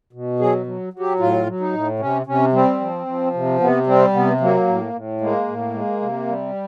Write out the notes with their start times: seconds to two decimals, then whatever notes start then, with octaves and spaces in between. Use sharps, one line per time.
0.13 B2
0.39 F#3 G#4
0.66 F#3
0.93 F#3
0.99 G4
1.20 A2 F4
1.46 F#3
1.60 D#4
1.73 A2
1.99 C3 C#4
2.26 C3 C#4
2.53 G3 C4
2.80 F3
3.06 F3
3.34 C3
3.60 C3 B3
3.87 G3 C4
4.13 C3 B3
4.41 F#3 A#3
4.67 A2
4.93 A2
5.21 G#3 A#3
5.48 A2
5.74 G#3
6.01 C3
6.27 G3